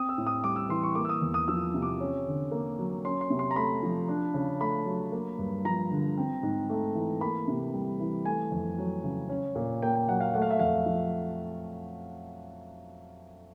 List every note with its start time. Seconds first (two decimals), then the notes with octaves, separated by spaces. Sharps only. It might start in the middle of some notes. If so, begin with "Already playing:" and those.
Already playing: C4 D#6
0.09 E6
0.18 A2
0.27 D#6
0.44 G3 D6
0.56 E6
0.69 E3 C6
0.83 C#6
0.95 A#3 D6
1.05 E6
1.09 D#6
1.22 E2
1.34 D#6
1.48 F3 E6
1.74 C3
1.82 D6
2.00 C#4
2.27 D3
2.51 A#3
2.79 F#3
3.05 C#4 C6
3.21 C6
3.30 C3
3.39 C6
3.51 A#5
3.56 A3 B5
3.83 F3
4.08 D4
4.34 C#3
4.60 A3 B5
4.86 F#3
5.12 A#3
5.39 G2
5.65 F3 A#5
5.91 D3
6.18 C4
6.43 G#2
6.70 A3
6.95 E3
7.21 A#3 B5
7.48 C3
7.74 G3
8.00 E3
8.25 A3 G#5
8.52 F2
8.78 F#3
9.04 C#3
9.29 C#4
9.55 A#2
9.82 A#3 G5
9.96 G5
10.09 F#3 F#5
10.20 F5
10.34 A3 F#5
10.42 F5
10.50 E5
10.59 F2 F5
10.86 F3